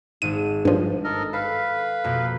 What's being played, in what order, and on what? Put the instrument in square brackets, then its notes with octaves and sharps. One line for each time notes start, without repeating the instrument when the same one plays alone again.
[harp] G#1 G#2 [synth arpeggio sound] D#7
[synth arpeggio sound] G2 F3
[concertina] A4 A#4 D#5
[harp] A4 [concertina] B4 F5
[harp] F2 B2 A#3